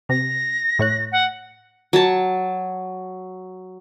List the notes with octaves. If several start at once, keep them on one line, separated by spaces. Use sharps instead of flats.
C3 A#6
A2 C#5 F#6
F#5
F#3 A5